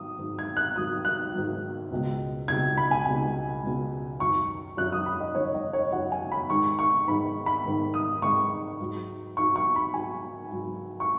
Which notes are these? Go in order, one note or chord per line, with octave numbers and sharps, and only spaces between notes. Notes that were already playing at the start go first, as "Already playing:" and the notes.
Already playing: G#2 D#3 F#3 D#6
G#2 D#3 F#3
G#6
F#6
G#2 D#3 F#3 D#6
F#6
G#2 D#3 F#3
C#2 B2 G#3
C#2 B2 G#3 G#6
B5
G#5
C#2 B2 G#3 G#5
C#2 B2 G#3
F#2 D#3 F#3 C#6
F#2 D#3 F#3 F#6
D#6
B5
D#5
F#2 D#3 F#3 C#5
D#5
C#5
F#2 D#3 F#3 F#5
G#5
B5
G#2 D#3 G#3 C#6
C#6
G#2 D#3 G#3 B5
B5
G#2 D#3 G#3
D#6
G#2 D#3 G#3 C#6
G#2 F#3
G#2 F#3 C#6
C#6
B5
G#2 F#3 G#5
G#2 F#3
C#6